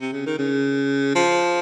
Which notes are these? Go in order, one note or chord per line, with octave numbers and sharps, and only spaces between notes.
C3
C#3
D#3
C#3
F3